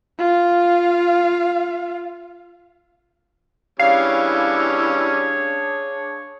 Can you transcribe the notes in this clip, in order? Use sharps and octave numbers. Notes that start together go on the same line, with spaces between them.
F4 F5
E3 G3 C#4 D4 G#4 C#5 F5